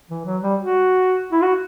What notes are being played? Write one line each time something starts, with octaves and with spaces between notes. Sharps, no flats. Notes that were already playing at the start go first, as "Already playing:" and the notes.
E3
F#3
G3
F#4
E4
F#4